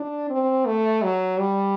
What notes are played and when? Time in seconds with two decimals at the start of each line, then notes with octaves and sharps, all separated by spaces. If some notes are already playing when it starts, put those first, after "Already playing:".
Already playing: D4
0.30 C4
0.66 A3
1.03 F#3
1.39 G3